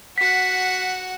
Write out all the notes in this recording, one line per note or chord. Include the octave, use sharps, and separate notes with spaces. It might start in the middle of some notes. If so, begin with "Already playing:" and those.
F#4 F#5 B6